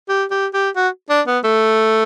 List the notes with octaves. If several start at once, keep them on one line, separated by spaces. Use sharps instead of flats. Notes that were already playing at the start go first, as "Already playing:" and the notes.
G4
G4
G4
F#4
D4
B3
A3